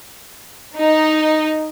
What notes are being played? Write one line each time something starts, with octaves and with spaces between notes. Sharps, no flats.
D#4